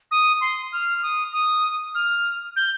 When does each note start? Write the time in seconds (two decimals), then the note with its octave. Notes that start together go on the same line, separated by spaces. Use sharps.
0.11 D#6
0.41 C6
0.73 F6
1.03 D#6
1.33 D#6
1.95 F6
2.56 G6